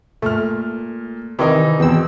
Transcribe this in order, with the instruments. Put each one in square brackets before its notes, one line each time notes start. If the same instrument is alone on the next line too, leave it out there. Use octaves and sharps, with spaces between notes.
[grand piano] A#2 F6 [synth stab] A3
[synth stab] C3 D#3 [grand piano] E3 D#4
[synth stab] E2 E6 [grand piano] B2 C4